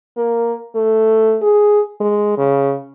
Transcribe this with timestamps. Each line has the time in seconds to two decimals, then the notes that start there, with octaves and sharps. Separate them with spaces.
0.17 A#3
0.75 A3
1.42 G#4
2.00 G#3
2.38 C#3